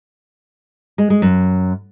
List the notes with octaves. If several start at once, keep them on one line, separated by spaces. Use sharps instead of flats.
G#3
G#3
F#2